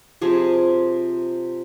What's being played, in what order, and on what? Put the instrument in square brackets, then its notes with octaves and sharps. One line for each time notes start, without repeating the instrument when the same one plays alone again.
[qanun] C3 F3 G#4